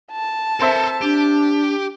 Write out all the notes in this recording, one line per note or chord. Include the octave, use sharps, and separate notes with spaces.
A5
C4 A4 A#4 C5 E5
D4 G4